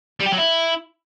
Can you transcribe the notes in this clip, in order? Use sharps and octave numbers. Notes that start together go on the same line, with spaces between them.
G3
G4
F#3
E4